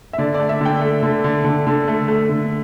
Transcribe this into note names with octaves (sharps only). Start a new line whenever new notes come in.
E5
D3 D5
D5
A3
E5
D3 G5
A3
D3
D3
D3
D3
A3
A3
D3